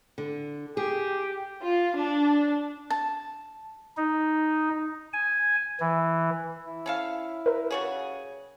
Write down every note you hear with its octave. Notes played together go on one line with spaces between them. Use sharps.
D3
G4 G#4
F4
D4
A5
D#4
G#5
E3
E4
C#4 A4 F5
A#4 B4
C#3 G3 F#4 G#4